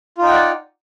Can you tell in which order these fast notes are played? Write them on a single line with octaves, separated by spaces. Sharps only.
F4 D#4 G5 F#5 D5